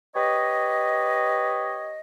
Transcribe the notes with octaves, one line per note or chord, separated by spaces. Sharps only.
G4 B4 C#5 D#5